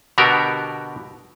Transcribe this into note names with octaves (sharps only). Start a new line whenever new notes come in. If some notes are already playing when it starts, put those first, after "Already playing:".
B2 D3 B3 F#4 G4 A#4